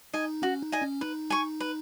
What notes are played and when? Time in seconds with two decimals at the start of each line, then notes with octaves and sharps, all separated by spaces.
0.14 D#4 D#5 G#5
0.42 C#4 F#4
0.62 D#4
0.72 D#5 G#5
0.82 C#4
1.01 D#4 B4
1.30 G#5 C#6
1.60 B4